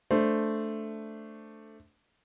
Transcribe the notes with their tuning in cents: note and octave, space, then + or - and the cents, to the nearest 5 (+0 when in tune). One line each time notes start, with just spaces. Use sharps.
A3 +0 D4 +0 C5 +0